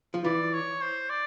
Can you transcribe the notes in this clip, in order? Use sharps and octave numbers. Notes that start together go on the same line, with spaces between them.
F3
E3 D5
C#5
C5
D5